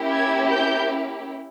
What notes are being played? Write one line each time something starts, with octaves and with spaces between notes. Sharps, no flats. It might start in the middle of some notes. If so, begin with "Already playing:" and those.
Already playing: A#3 C#4 E4 G4
G#6
G6